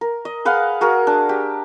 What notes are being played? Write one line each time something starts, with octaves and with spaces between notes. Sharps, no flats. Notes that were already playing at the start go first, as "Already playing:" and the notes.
A#4
D#5
G#4 B4 F5 F#5
F#4 G#4 A#4
D4
G4